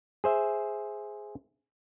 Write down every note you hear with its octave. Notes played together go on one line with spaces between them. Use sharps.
G#4 C5 E5